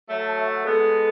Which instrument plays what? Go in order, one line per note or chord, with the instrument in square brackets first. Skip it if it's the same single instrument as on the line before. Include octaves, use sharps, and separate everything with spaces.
[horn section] F#3 A3 [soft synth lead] A5
[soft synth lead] A5
E5
F#5
[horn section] G#3 B3 [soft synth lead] A4